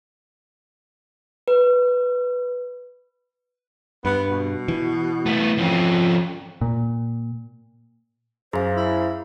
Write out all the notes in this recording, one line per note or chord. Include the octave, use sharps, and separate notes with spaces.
B4
G2 B3
B2
E3
A3 B3
F2 F3 C#4
A#2
F#2 G#4 C5 F5
E4